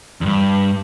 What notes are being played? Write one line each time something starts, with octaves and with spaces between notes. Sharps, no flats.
E2 G2